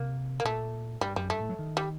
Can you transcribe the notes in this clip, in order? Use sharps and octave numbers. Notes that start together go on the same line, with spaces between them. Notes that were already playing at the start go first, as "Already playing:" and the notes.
Already playing: C3 A#3
A#3
A#2 A3
G2 G3
F#2 G3
G2 A3
A2
F#3
D#3
G3